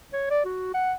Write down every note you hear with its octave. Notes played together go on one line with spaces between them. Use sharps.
C#5
D5
F#4
F#5